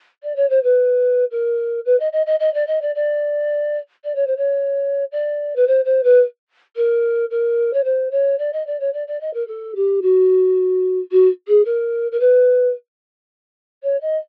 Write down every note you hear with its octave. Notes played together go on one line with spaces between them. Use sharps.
D5
C#5
C5
B4
A#4
B4
D#5
D#5
D#5
D#5
D5
D#5
D5
D5
D5
C#5
C5
C#5
D5
B4
C5
C5
B4
A#4
A#4
C#5
C5
C#5
D5
D#5
D5
C#5
D5
D5
D#5
A#4
A4
G4
F#4
F#4
G#4
A#4
A#4
B4
C#5
D#5